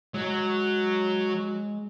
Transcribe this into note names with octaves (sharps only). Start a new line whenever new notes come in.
F#3 G#3